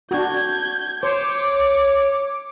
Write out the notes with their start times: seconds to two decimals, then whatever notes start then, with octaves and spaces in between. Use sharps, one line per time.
0.11 D4 F#4 G6 G#6
1.03 C5 C#5 D6